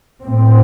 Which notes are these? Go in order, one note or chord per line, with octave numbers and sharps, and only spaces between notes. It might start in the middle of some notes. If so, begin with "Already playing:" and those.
A2 C4